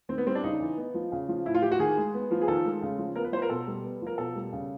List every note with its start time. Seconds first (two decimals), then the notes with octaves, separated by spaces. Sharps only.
0.09 D#3 C4
0.18 B3
0.27 G3 C4
0.35 D4
0.43 C#3 D#4
0.60 E3
0.78 B3
0.94 F3
1.12 C#3
1.28 F3
1.45 A2 E4
1.54 F4
1.62 F3 G4
1.71 F#4
1.79 D#3 G#4
1.97 G#3
2.14 B3
2.31 F3
2.42 G#4
2.48 D#3 A4
2.65 G#3
2.82 C#3
2.98 F3
3.16 B3 A#4
3.24 B4
3.32 F3 C5
3.37 B4
3.42 A#4
3.50 B2 A4
3.67 G3
3.84 B3
4.01 F3
4.07 A#4
4.18 B2 A4
4.36 G3
4.52 C#3